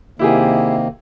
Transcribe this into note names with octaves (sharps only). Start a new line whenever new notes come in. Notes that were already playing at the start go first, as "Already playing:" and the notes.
C3 D#3 A#3 E4 G4 G#4